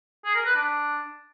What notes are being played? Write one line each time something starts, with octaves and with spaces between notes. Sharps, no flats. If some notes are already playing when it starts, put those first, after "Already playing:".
G#4
A#4
B4
D4